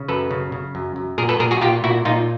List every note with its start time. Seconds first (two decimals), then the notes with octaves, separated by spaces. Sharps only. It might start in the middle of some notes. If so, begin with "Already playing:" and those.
Already playing: C#3
0.08 F#2 A4 B4
0.31 C#3
0.52 C#3
0.75 F#2
0.96 F#2
1.18 A#2 G#4 A#4
1.29 A4 B4
1.39 A#2 G#4 A#4
1.51 F#4 G#4
1.61 A#2 F4 G4
1.84 A#2 E4 F#4
2.05 A#2 D#4 F4